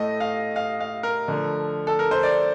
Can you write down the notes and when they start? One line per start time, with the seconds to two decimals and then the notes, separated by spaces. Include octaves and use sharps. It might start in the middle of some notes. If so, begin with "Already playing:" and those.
Already playing: A2 A3 D#5
0.20 F5
0.56 F5
0.80 F5
1.03 A#4
1.28 D3 F3 A3
1.87 A4
1.99 A#4
2.11 C5
2.23 D5